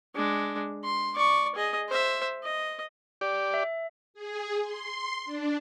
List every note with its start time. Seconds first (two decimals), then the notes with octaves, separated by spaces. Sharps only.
0.15 G#3 D4
0.84 C6
1.15 D5 C#6
1.55 G#4 D#5
1.89 C5 E5
2.43 D#5
3.21 G4 D5
3.54 E5
4.14 G#4
4.62 C6
5.25 D4